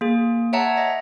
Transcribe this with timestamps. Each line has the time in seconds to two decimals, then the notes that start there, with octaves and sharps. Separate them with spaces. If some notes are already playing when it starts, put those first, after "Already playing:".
0.01 A#3 G#4
0.53 C#5 E5 F#5 A5 A#5
0.78 D#5